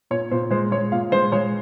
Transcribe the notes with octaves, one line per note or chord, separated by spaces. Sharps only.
A#2 C#5
A#2 C5
G#3 C5
G#3 C#5
A#2 F5
G#3 C5
G#3 C#5